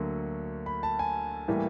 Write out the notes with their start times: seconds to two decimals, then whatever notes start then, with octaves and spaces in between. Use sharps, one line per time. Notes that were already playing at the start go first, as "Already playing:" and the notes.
Already playing: D2 D3 F#3 A#3
0.66 B5
0.83 A5
0.99 G#5
1.48 A2 E3 G3 A#3